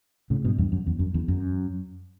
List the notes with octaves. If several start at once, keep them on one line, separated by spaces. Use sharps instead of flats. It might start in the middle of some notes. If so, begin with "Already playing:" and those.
A2 C#3
G2 B2
E2 G2
F#2
E2
F#2
E2
F#2